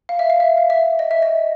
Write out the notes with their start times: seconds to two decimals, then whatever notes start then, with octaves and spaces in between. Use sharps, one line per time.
0.09 F5
0.19 E5
0.30 F5
0.40 E5
0.57 F5
0.70 E5
0.99 D#5
1.11 E5
1.22 D#5